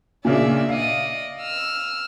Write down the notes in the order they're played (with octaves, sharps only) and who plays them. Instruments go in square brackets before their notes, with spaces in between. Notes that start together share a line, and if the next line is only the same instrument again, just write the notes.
[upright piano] A#2 C#3 D4 [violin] D5 E5
[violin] D5 D#5 [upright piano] F5
[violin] E6 F6